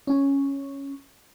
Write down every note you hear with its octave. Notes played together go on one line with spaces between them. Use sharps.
C#4